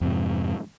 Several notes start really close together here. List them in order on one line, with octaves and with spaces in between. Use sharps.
F2 C3 G#2